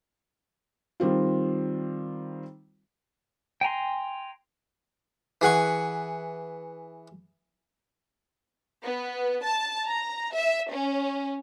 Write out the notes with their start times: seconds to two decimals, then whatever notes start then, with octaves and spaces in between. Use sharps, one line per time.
1.00 D#3 G3 C4 F4
3.61 G5 G#5 A#5 C6
5.41 E3 G#4 F#5 C#6
8.82 B3
9.42 A5
9.87 A#5
10.34 E5
10.70 C#4